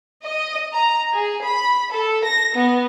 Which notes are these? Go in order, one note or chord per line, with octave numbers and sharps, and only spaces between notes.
D#5
A#5
G#4
B5
A4
A#6
B3